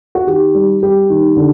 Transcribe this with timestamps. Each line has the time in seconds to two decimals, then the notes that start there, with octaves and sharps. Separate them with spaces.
0.15 F#4
0.27 D#3 G4
0.55 G3
0.83 G3 G4
1.10 D#3
1.36 D3